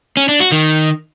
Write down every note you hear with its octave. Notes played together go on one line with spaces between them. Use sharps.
C#4
D4
F#4
D#3